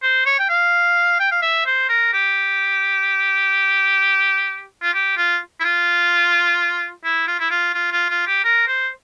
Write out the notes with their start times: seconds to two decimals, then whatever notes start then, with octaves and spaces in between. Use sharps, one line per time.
0.02 C5
0.26 C#5
0.39 G5
0.49 F5
1.20 G5
1.31 F5
1.42 E5
1.66 C5
1.89 A#4
2.13 G4
4.82 F4
4.94 G4
5.17 F4
5.60 E4
5.64 F4
7.04 E4
7.28 F4
7.40 E4
7.50 F4
7.74 F4
7.92 F4
8.09 F4
8.27 G4
8.44 A#4
8.68 C5